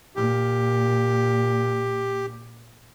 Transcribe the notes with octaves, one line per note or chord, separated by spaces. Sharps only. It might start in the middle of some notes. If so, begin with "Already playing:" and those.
A#2 G4